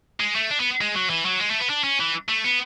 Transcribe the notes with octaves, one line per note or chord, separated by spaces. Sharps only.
G#3
A3
D4
B3
G#3
F#3
E3
F#3
G#3
A3
B3
D4
C#4
E3
A3
B3